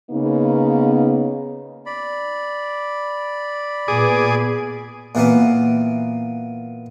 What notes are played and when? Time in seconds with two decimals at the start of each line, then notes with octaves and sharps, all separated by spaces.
0.11 C#3 A#3 B3 D#4
1.86 D5 B5
3.88 A#2 B3 G#4 D6 D#6
5.15 A#2 E3 A#3 B3